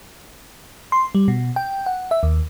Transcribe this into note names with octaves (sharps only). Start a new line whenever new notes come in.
C6
G3
B2
G5
F#5
E5
D#2